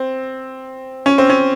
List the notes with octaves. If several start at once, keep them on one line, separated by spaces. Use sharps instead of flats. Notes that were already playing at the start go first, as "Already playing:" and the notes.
Already playing: C4
C#4
C4
C#4